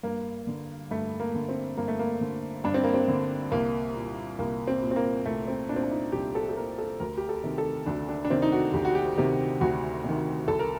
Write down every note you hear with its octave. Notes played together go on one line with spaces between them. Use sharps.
G2 A#3
D3
G2 A3
A#3
D3
C4
G2 A#3
A3
A#3
D3
G2 D4
C4
A#3
C4
D3
C2 A#3
A#2
C2 A#3
C4
A#2
C4
A#3
C2 A3
C4
A#2 D4
C4
D4
D#4
C2 G4
A4
A4
A#2 A#4
A4
D2 A#4
G4
A4
C3 D#3
A4
D2 D4
D4
D4
C3 D#3 C4
D#4
F#4
D2 G4
F#4
G4
C3 D#3 G4
D2 F#4
C3 D#3
C2 A4
A#4